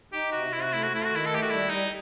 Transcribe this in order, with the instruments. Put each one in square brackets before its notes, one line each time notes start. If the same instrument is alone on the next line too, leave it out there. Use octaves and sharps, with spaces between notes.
[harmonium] D#4 [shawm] G4
[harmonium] C3 [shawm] F#4
[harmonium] C3 [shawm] E4
[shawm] F#4
[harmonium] A3 [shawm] E4
[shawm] F#4
[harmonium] A3 [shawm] E4
[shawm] F#4
[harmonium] D#3 [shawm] E4
[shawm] A4
[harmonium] A3 [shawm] G4
[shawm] F#4
[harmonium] G3 [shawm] E4
[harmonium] G3 [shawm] D#4